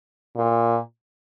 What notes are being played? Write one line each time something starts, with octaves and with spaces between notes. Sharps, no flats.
A#2